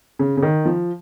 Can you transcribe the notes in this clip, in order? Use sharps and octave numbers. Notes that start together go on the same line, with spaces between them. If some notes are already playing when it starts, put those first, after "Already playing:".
C#3
C#3
D#3
F3